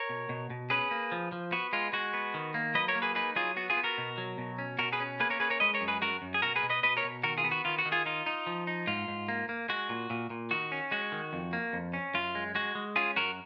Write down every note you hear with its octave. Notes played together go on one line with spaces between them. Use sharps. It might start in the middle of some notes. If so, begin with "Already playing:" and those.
Already playing: A#4 C#5
B2
B2
B2
C#4 G#4 B4
A#3
F3
F3
B3 F#4
G#3 F4
G#3 F#4
B3
D#3
A#3
F#3 B4 D#5
A#4 C#5
A#3
G#4 B4
D#4 G#4 B4
F#3 F4 G#4
B3 F#4
F4 G#4
B3
F#4 A#4
B2
F#3
B2
C#4
B2 F#4 A#4
G#4 B4
C#4
A#3 G#4 B4
A#4 C#5
C#4 G#4 B4
A#4 C#5
G#3 B4 D#5
A#4 C#5
F#2
G#4 B4
F#2 F#4 A#4
F#2
G#4
B2 F#4 A#4
G#4 B4
B2
B4 D#5
B2 B4 D#5
A#4 C#5
B2
D#3 F#4 A#4
F4 G#4
B3
F#4
D#3 F4
F#4
D#3
F4 G#4
D#4 F4
D#4
F3
D#4
G#2 F4
G#2
A#3
A#3
G#3 F#4
A#2
A#2
A#2
D#3 F#4
C#4
G#3 F#4
D#3
F2
A#3
F2
C#4
F#2 F4
G#3
G#3 F#4
G#3
C#4 F4 G#4
F#2 F#4 A#4